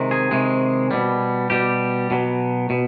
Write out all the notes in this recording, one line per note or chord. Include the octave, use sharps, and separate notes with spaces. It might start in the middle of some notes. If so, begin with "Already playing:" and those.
Already playing: C3 D#3 G#3
G#4
C3 D#3 G#3
B2 G3
B2 G3 G4
B2 F#3
B2